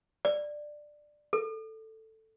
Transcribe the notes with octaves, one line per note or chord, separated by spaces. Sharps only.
D5
A4